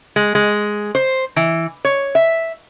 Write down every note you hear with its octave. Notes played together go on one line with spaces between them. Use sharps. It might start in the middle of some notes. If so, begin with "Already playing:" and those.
G#3
G#3
C5
E3
C#5
E5